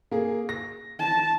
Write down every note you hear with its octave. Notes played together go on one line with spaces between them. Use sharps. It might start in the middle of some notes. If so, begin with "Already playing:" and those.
A#3 G#4
A#6
A5